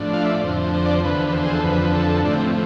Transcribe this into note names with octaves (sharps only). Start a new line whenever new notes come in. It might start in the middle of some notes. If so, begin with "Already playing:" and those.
Already playing: A2 F3 D4
F5
E5
D5
F2 D3 F3 C5
C5
D5
C5
E2 D3 F3 B4
B4
C5
G#4
A4
F2 D3 F3 B4
A4
A2 F3 D4
C4